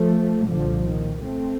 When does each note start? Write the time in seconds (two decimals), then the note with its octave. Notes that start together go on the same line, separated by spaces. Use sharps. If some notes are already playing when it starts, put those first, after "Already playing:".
Already playing: F3 A3
0.45 C2 A#2 D3 F3
0.83 D#3
1.22 A3 C4